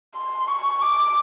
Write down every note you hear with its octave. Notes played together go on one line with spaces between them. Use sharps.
C6
C#6
D6